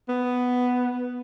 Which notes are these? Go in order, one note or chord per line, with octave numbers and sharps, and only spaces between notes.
B3